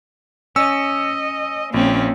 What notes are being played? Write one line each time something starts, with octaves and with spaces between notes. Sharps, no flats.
C#4 D#5 E6
A#1 A#3 C4 C#4